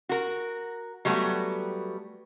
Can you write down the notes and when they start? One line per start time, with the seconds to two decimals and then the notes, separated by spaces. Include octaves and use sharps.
0.09 F#4 A#4
1.05 F#3 G3 A3 B3